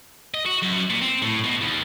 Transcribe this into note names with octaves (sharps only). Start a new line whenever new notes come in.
D#5
F#4
F#2
A#2
C4
A2
B2
D#2